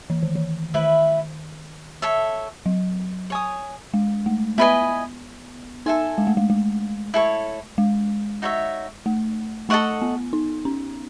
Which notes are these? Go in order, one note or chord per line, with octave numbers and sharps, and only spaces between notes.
E3
D#3
E3
D#3 E4 B4 E5
A4 C#5 E5
F#3
C#5 G#5 D#6
G#3
A3
B3 E4 B4 D#5 G#5
D#4 A4 E5 G#5
G#3
A3
G#3
G#3
E4 A4 C#5
G#3
D#4 F#4 C#5 E5
A3
A3 A4 D#5 F#5 C#6
B3
D#4
C#4